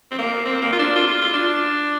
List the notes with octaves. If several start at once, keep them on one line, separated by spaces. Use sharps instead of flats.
C4
A#3
C4
A#3
F4
D4
F4
F4
F4
D4